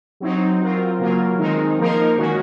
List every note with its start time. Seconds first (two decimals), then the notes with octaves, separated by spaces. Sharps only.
0.20 F#3 C4 D#4
0.60 F#3 C4 F4 A#4
0.99 C#3 F#3 A#3 F4 A#4
1.38 D#3 G#3 C4 D#4 A#4
1.78 F3 A#3 D#4 A#4
2.18 D#3 G#3 C#4 F#4